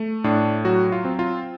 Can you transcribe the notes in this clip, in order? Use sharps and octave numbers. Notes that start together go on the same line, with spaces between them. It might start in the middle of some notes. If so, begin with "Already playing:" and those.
Already playing: A3
A2 D4
F#3 F#4
F4
C4
F4